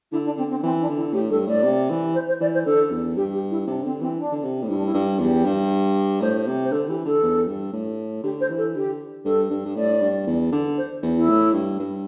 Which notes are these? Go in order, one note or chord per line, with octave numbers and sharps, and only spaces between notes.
D3 E4
D4
D3 C4
C4
E3 C4
D4
D3
E4
A2 G4
G2 A4
A2 D5
C3
E3
C5
C5
E3 D5
C5
D3 A4
E2
G2 G4
G4
E4
C3 D4
D3 C4
E3 C4
D4
D3
C3
A2
G2 E4
D4
E4
G2
E2 G4
G2
A2 C5
C3
C5
D3 A4
E3 G4
D3 A4
E2
G2
A2
D3 G4
C5
E3
A4
D3 G4
G2 A4
G2
G2
A2 D5
G2
E2
D3
C5
E2
E4
A2
G2
G2